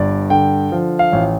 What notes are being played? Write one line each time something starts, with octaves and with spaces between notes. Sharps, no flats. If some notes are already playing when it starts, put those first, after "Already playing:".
Already playing: G1 G2 D5
D3 G5
F3
F5
A1